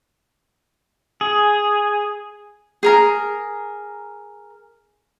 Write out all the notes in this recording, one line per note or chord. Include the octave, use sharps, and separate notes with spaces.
G#4
G#4 A#4 A#5